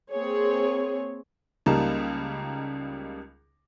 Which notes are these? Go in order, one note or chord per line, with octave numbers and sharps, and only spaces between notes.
A#3 C4 G#4 C#5
C#2 C#3 G3 A#3 D#4 A5